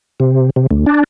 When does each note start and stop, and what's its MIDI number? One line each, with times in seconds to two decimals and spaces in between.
0.20 0.50 48
0.56 0.67 48
0.71 0.85 38
0.86 1.04 62